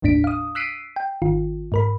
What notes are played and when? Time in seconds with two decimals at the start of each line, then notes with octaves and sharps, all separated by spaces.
0.02 G1 D#2 A2 D4 B6 D7
0.24 F5 D#6
0.55 E6 F#6 B6 C7 D7 D#7
0.96 G5
1.22 G#1 D#3 F4
1.72 G#2 A#4 B5